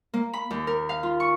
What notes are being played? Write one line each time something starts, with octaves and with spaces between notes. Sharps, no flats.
A#3
B5
D#2
A#4
F5
F4
C#6